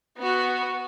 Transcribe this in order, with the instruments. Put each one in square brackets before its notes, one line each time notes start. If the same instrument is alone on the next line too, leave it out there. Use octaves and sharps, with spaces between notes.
[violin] B3 F#4